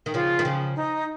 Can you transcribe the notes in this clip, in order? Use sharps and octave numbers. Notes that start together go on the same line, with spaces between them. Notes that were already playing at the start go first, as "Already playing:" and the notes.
D#3
C#3 F3 F4
D#3
C#3 F3
D#4